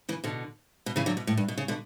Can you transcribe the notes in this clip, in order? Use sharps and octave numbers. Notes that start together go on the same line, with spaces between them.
C#3 E3
B2 D3
B2
C#3 E3
D3 F#3
B2
A2
G2
B2
C#3
B2 D3